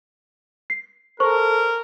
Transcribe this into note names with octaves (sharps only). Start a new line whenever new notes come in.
C7
A4 A#4 C5 C#6